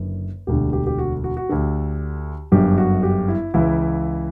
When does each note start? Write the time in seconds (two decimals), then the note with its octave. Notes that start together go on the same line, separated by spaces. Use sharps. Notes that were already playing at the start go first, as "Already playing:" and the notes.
Already playing: F#1 F#2 D3 B4
0.47 E1 D2 D3 G4
0.73 G4
0.87 G4
0.98 F#4
1.24 F#4
1.37 F#4
1.49 D2 D3 G4
2.52 G1 F#2 D3 G4
2.78 F#4
3.03 G4
3.28 E4
3.54 C#2 C#3 E3 E4